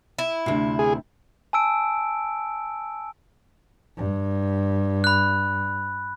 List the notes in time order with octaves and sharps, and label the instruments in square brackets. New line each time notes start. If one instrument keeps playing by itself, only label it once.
[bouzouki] E4
[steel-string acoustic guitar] D2 C3
[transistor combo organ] G#4
[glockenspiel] G#5 A5 E6 D7
[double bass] G2
[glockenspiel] B5 F#6